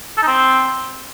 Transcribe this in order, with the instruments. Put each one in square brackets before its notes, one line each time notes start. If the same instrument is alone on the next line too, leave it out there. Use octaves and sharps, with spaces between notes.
[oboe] A4
D#4
C4